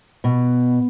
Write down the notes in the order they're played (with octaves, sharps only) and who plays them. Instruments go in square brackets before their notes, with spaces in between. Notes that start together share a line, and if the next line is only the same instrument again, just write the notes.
[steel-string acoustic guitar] B2